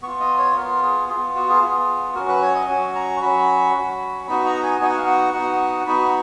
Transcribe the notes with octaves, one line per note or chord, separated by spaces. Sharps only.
B3 F4 C#6
D#5
C#5
B3 F4 A#4
G#4
B3 F4 G#4
F#4
G#4
B3 F4
F#3 C#4 F#4 A#4
B4
C#5
D#5
F#3 C#4 F#4 G#5
A#5
C#6
F#3 C#4 F#4 B5
F#3 C#4 F#4
B3 D#4 F#4 B5
A#5
G#5
B3 D#4 F#4 G#5
F#5
F5
F#5
B3 D#4 F#4 F#5
B3 D#4 F#4 B5